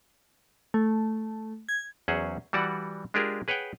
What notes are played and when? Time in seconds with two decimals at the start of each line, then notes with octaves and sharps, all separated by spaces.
0.74 A3
1.69 G#6
2.08 E2 F#3 C#4 G#4 C5 F#5
2.53 E3 G3 F#4 D5 F#5
3.14 G#3 D4 F4 G4 G#4 A#4
3.48 G#4 B4 C#5 F#5 G5